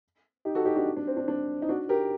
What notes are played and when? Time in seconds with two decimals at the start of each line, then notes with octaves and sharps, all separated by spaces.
0.45 D#4 G4
0.55 F#4 A4
0.65 D#4 G4
0.75 D4 F#4
0.96 D4
1.07 C4
1.17 D4
1.28 D4
1.62 D#4
1.69 D4 F#4
1.89 G4 A#4